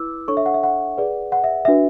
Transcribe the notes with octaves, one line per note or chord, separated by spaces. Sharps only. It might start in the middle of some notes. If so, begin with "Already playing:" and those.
Already playing: E4 B4 D6 E6
D4 A4 C#5 C#6
E5
F#5
E5
F#5
G#4 B4 D5
F#5
E5
D4 F#4 B4 E5